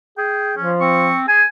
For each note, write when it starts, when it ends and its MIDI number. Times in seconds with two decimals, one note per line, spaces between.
0.17 0.57 68
0.17 0.54 79
0.57 1.15 53
0.57 0.71 61
0.81 1.25 60
0.81 1.19 85
1.28 1.42 68
1.28 1.45 80